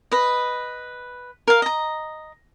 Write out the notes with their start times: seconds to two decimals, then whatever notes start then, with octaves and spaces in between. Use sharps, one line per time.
0.11 B4 D#5
1.48 A#4 F5
1.62 D#5 A#5